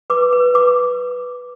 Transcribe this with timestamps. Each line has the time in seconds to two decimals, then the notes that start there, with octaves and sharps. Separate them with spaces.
0.10 B4 D6
0.33 B4
0.54 B4 D6